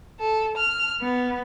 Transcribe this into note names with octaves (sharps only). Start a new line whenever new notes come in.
A4
F6
B3